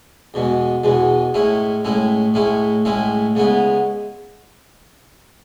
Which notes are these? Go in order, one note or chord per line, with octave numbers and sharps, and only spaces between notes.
E2 B2 G#3
E2 B2 G#3
A2 G#3 C#4 E4
A2 G#3 C#4 E4
A2 G#3 C#4 E4
A2 G#3 C#4 E4
C#3 G#3 B3 E4